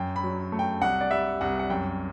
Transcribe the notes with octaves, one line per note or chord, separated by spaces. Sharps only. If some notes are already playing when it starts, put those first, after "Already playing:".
Already playing: F#2 G5
B5
F#3
A3
G5
C2 F#5
D5
G3 E5
C2 F#5
F#5
F#2 G5